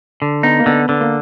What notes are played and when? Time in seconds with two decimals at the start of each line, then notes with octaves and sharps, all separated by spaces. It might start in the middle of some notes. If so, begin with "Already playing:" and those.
0.22 D3
0.43 B3 D#4
0.59 A#3
0.66 D3 B3
0.89 D3 B3
1.01 A#3